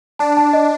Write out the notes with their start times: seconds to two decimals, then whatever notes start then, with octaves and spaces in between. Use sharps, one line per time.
0.19 D4 A5
0.37 A5
0.53 D#5